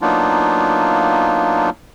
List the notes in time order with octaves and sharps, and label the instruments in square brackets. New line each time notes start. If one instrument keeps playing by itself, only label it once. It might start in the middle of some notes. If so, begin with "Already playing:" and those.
[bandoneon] F#3 A#3 B3 D4 D#4 F4